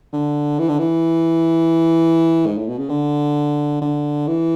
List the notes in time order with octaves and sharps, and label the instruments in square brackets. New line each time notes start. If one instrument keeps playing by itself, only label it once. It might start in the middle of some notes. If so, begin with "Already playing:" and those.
[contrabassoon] D3
E3
D3
E3
G#2
A2
B2
C#3
D3
D3
E3